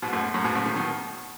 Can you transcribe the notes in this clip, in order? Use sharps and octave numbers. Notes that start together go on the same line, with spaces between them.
G#2 B2
F#2 A2
F#2 A2
G#2 B2
A2 C#3
B2 D#3
B2 D#3